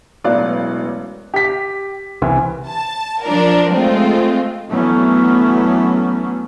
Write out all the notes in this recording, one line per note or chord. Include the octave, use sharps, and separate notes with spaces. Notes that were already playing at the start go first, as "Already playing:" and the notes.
E1 A1 F#3 D5 F5 F#6
G4 B6
C2 E3
A5
F3 D4 A#4
G#3 A3 C4 F4
D2 E3 F#3 A3 B3 C#4